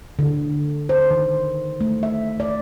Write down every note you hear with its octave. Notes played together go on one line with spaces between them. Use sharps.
D3
C5
D#3
A3
E5
D5